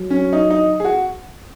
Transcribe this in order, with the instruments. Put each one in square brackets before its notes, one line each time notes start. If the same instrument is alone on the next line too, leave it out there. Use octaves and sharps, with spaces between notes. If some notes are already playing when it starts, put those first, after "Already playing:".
Already playing: [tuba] F#3
[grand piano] C#4
D#4
D#4
G#4
F#4